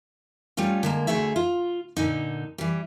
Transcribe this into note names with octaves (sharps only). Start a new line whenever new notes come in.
G3 A3 C#4 F4
D3 G#3 A#3
D2 B2 D3 A3 G#4 E5
F4
A#2 D3 D#4
E3 G3